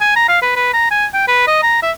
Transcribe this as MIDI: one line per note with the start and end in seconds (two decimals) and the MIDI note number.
0.01 0.13 80
0.16 0.26 82
0.28 0.39 77
0.42 0.53 71
0.56 0.71 71
0.73 0.87 82
0.91 1.06 80
1.14 1.23 79
1.28 1.43 71
1.47 1.60 75
1.63 1.80 82
1.83 1.91 76